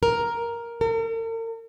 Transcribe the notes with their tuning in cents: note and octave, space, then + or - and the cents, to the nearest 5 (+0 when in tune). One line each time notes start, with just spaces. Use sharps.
A#4 +5
A#4 -45